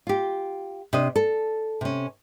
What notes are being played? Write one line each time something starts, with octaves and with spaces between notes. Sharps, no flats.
F4 G4
C3 D4 D#5
A4
C3 C#4